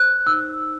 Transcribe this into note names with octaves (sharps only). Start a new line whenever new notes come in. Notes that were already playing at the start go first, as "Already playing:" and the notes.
Already playing: C5 F#6
D#4 E6